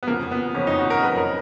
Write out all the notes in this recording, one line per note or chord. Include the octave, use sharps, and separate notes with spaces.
B3
F2 C#3 F3 A#3
B3
F2 C#3 F3 C#4
D#4
F#4
A#4
F2 C#3 F#3 B4
A#4